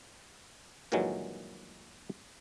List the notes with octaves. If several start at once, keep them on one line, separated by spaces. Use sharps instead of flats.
G2 A#2 D#3 E3 F#3 G#3